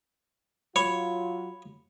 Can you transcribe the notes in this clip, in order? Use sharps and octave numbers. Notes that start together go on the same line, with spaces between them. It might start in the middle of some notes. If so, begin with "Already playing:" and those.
F#3 F4 C#5 B5